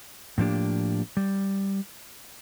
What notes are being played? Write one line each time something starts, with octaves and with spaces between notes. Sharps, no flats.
A2 F3 A#3 D4 G4
G3